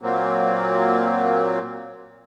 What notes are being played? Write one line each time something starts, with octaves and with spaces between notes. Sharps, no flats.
A#2 F#3 A#3 C4